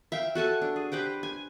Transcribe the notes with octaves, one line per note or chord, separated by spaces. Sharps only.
E5 F5 G5
F#4 A4 G#5 A5
D4
G#4
G4 B4 C5 G5
G#5